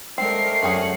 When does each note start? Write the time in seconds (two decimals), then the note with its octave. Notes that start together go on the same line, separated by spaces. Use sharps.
0.18 G#3 A3 C4 D4 A#4 C7
0.63 F#2 F#3 C#4 G#4 F#5